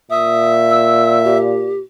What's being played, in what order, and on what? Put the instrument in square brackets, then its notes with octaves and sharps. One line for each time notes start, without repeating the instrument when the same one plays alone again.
[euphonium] A#2 [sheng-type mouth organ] E5 [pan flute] D#6
[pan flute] E6
G4